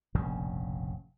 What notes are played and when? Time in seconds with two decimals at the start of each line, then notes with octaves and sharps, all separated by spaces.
0.15 F1 A#1 G2 C#3